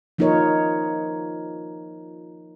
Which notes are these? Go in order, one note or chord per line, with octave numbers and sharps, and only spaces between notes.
F3 A#3 D#4 F4 A#4 C#5